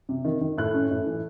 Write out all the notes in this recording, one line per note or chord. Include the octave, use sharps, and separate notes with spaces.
C3
D#3
D#3
A2 F#6
C#4
A2
E3